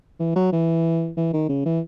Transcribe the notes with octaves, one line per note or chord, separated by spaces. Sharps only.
E3
F#3
E3
E3
D#3
C#3
E3